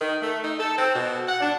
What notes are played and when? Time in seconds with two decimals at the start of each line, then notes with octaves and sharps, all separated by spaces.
0.01 D#3
0.22 A3
0.44 D#4
0.59 A4
0.78 C4
0.96 B2
1.28 F#5
1.40 D4